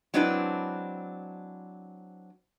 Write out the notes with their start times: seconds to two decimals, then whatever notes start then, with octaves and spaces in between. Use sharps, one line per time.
0.14 F#3 G#3 C4 D4 E4 B4